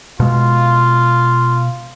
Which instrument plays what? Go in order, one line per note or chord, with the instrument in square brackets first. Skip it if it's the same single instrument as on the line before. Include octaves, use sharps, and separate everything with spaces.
[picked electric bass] B2 G#3 [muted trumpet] F4